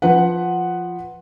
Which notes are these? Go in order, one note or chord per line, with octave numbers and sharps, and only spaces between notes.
F3 B4 F#5